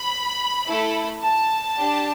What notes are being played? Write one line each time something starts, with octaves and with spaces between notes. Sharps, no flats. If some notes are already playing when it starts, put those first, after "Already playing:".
Already playing: B5
A3 E4 A4
A5
D4 G4